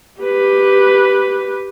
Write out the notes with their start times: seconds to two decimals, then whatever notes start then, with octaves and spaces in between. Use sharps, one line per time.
0.21 G4 B4